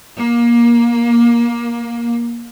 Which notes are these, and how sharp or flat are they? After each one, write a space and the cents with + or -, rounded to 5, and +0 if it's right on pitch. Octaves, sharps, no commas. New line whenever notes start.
A#3 +20